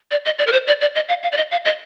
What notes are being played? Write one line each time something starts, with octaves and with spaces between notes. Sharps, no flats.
D5
D#5
D5
A#4
C5
D5
D5
D#5
F5
F5
D5
D#5
F5
D#5